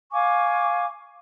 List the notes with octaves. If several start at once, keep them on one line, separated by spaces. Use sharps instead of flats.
F5 G#5 C#6 D6